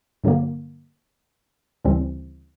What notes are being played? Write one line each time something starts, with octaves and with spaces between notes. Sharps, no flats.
G2 D3 F#3 A#3
D2 C#3 E3 G3 C4